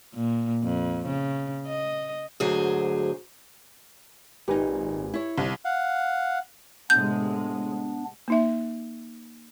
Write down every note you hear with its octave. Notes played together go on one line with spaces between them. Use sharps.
A#2
F2
C#3
D#5
D2 G#2 F#3 G#4 C5
G#1 A#2 D#4 G4 B4 G#5
E4 C#5
G1 C2
F5 F#5
A2 C3 G#3 B3 D4 G6
A#3 D#4 E5